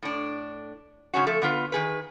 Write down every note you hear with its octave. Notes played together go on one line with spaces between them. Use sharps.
A2 D4
G#2 C#3 C#4 F#4
F3 A3 A4
D3 B3 F4 B4
D#3 G#4 B4